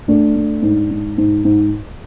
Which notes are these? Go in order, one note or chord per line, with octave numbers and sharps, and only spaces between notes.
A3 D4
A3
G#2
G#2
G#2
G#2